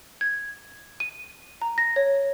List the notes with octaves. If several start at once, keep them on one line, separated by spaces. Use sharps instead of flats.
G#6
D#7
A#5
A#6
C#5